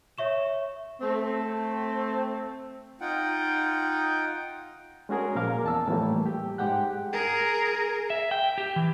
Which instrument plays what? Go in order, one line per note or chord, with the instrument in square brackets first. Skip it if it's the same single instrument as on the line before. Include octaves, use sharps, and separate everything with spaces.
[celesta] C#5 E5 C#6 E7
[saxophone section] A3 C4
[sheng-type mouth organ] D#4 F4 F#5 G5
[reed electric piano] G#3 C#4 F#4 G#4 A#4
A#2 F3 A#4 F5 D6
E2 A5 E6
A2 E3 F3 G3 A3 A#3
G4
G#2 G#3 G4 F#5 G5 F#6
[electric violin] G#4 A#4
[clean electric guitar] E5
G5
G4
E3